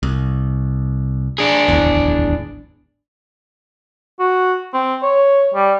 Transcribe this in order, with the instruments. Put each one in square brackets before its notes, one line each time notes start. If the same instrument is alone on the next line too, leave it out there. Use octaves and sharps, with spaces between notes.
[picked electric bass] C2
[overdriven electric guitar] D4 G#4
[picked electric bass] D1 G#1 E2
[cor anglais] F#4
C4
C#5
G3